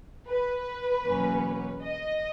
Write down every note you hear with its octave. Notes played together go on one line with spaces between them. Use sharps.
B4
E2 B2 F#3 A#3 C#4
D#5